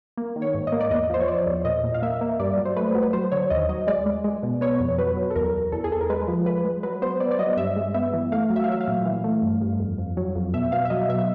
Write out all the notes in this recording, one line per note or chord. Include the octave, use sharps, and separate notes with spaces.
A#3
D#3
C#5
G#2
D#5
A#3
D5
E2 D#5
F3 C5
C#5
F3 D5
E2
A#2 D#5
A#2
F5
A#3 E5
A#3
G2 D5
F#3
C5
A3 B4
F#3
B4
F#3 C5
D3 C#5
D#2 D#5
F#3 D#5
G#3 D5
G#3
G#3
B2
B3 C#5
F2
F#3 B4
F#3
A4
E2 A#4
E2
E2 A4
G#4
E2 A4
A#4
G#3 B4
F3
F3 B4
G#3
F#3 B4
B3 C5
B3 D5
D5
F#3 D#5
G2 E5
G#3
B3 E5
E3
A3 F5
F#3
E5
F5
F#3 E5
F5
A#2
E3
A3
G2
G2
F2
F2
F#3
F2
B2 E5
B2 F5
E5
F#3 D#5
B2 E5